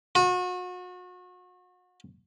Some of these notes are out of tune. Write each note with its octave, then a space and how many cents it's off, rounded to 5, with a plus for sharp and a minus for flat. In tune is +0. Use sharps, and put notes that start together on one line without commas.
F#4 -35